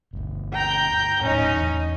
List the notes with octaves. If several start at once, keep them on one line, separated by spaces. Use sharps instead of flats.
G1 D2
G5 A#5 G6
D#1 A2 C#4 D#4 D#5
E2